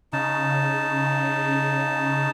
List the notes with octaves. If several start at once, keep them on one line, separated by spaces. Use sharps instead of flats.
C#3 D#4 A5